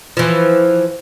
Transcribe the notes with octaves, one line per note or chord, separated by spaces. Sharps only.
E3 F3